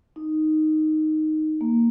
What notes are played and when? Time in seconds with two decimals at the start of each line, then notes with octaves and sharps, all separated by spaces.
0.16 D#4
1.61 A#3